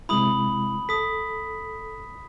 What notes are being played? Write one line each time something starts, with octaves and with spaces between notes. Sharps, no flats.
C3 G#3 E4 B5 D#6 F#7
A4 D#6 B6